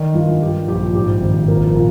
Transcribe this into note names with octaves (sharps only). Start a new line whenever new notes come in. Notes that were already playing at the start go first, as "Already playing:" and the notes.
Already playing: D#3 D5
G2 F4
F3 G4
A#1 G4
G#2 G4
G#1
A#1 A#4
A#2